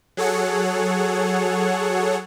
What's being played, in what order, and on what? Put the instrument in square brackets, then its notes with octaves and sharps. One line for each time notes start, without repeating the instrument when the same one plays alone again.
[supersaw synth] F#3 G#4 A4 C#5 F#5